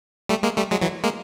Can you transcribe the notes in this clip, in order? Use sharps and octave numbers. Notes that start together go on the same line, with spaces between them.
G3 A3
G#3 A#3
G3 A3
F#3 G#3
E3 F#3
G#3 A#3